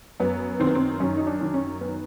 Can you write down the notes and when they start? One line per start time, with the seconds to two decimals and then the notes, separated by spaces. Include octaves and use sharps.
0.20 F#2 B3
0.59 D#3 C4
0.67 B3
0.75 C4
1.00 F#2 C#4
1.17 D#4
1.27 D4
1.41 D#3
1.54 C#4
1.81 B3